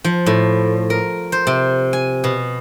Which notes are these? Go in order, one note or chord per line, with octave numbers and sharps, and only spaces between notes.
F3
A2
A#4
C5
C3
G#5
B2